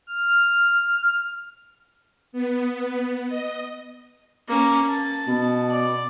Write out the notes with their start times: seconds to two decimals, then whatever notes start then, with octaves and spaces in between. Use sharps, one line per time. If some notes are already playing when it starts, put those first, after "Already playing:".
0.07 F6
2.32 B3
3.27 D#5
4.48 A#3 C#4
4.89 A5
5.27 B2
5.71 D5